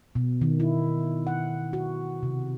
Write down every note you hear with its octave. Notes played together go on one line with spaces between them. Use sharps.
B2
D#3
E4
F#5
F#4
C3